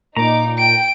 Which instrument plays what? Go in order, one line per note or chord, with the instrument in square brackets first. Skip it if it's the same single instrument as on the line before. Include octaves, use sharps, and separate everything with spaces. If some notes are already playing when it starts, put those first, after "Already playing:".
[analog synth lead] A#2 [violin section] D#4 D6 [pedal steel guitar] A#5
[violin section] G5 [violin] D7